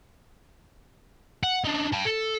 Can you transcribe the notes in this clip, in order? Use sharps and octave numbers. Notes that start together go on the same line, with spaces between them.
F#5
D4 D#4
G5 A5
A4